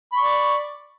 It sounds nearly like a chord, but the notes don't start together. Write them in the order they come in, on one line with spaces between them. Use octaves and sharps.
B5 C#6 D5